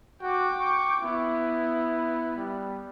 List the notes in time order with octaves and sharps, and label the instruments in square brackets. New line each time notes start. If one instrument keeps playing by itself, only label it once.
[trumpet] F#4 [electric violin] G5 D6
[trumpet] C#6
[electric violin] B3 [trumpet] E4
[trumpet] G3